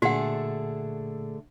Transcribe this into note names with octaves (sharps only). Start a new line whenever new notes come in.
A#2 D3 A3 F#4 G#4 F#5